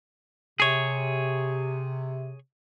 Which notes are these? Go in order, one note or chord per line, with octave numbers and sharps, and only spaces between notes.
C3 G#4 C#5